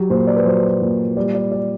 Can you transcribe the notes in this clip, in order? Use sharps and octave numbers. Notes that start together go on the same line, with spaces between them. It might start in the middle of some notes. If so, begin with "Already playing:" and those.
Already playing: F#3 G4
A#2 C5
D5
B4
F#3 C5
A#2
G3 D5
D5
D5